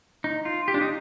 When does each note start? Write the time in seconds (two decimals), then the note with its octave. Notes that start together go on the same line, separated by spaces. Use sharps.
0.24 D#4
0.45 F4
0.68 G4
0.74 D4
0.81 D#4